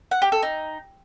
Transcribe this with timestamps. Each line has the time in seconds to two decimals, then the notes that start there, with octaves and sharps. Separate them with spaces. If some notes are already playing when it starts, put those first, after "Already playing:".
0.11 F#5
0.22 G4
0.32 A4
0.42 D#4